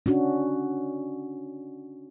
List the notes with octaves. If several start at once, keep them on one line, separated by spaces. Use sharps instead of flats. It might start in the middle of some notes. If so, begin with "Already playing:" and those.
C#4 D4 F#4